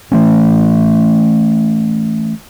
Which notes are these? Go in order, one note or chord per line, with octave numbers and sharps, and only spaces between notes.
E3 A3 C#4